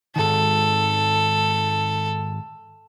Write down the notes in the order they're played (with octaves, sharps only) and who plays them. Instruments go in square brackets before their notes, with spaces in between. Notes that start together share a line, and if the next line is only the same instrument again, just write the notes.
[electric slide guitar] G#2 D#3 [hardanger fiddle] A4